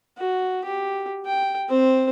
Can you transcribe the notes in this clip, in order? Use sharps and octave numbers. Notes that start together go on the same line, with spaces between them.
F#4
G4
G5
C4 C5